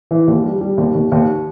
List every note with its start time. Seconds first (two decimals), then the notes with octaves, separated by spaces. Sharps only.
0.11 E3
0.28 D#2
0.44 G3
0.61 G3
0.78 D#2
0.95 D#2
1.12 D#2